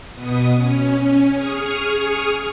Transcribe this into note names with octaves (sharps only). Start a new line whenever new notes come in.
B2 B3 D#6
C#4
G#4 C#6 D#6 F6